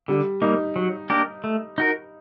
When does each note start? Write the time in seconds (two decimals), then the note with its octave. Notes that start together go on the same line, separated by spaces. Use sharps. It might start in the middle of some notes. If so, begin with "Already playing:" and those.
0.08 D3 G3
0.42 G3 A#3 D#4
0.76 F#3
1.10 A#3 D4 G4 A#4
1.44 A3
1.78 D#4 F#4 A#4